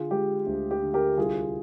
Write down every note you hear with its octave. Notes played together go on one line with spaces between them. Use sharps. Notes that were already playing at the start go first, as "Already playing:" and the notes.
Already playing: D3 F4 G#4
G#3 G4
D2
G4
D3
G4 A#4
C2 F4 G#4